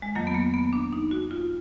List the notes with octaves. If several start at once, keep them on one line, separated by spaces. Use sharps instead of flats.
G#3
F2 D#3 F#3 A#3
B3
A#3
B3
D4
D#4
F#4
F4